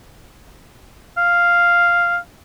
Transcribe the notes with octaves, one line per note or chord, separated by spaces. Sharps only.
F5